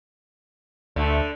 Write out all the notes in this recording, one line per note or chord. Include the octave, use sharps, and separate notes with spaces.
D2 D3 A3